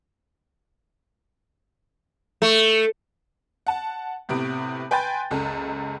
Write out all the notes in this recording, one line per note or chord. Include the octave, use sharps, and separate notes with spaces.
A3
F#5 A5
A2 C3 B3 D7
B4 G5 G#5 C6 G6 A6
F#1 C#2 A4